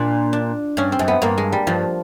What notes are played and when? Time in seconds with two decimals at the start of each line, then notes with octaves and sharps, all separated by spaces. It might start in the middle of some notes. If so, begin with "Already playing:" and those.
Already playing: A#2 D4
0.33 D4
0.77 G2 C#4
0.92 C4
0.99 F#2
1.08 B3
1.22 G2 A#3
1.38 G#3
1.52 G3
1.67 G2 F3